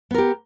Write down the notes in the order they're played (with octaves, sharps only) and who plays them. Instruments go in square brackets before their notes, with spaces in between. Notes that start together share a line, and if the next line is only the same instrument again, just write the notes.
[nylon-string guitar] B3
A#4
G4